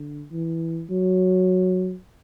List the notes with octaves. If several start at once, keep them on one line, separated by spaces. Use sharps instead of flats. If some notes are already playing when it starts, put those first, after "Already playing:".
Already playing: D3
E3
F#3